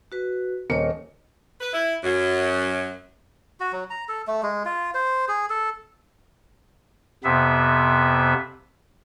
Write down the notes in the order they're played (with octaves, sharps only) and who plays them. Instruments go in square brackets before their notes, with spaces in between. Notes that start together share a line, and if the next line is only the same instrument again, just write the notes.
[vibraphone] F#4 B4
[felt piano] D#1 A#4 C#7 [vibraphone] C#5 D#5
[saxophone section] B4
E4
F#2
[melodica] F#4
F#3
A#5
A4
A3
G#3
F4
C5
G#4
A4
[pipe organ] F2 C3 B3 E5